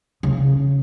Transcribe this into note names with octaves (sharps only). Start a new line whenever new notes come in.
C#3